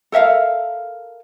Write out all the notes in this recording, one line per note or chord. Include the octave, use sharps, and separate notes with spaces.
A4 A#4 E5 F5